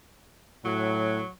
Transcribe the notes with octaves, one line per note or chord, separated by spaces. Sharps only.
A2 F#3